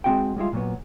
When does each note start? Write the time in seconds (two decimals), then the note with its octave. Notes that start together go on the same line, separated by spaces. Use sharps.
0.04 G#3 A3 C4 F#4 F#5 G5
0.36 G3 G#3 E4 F4
0.53 A#2 F#3 B3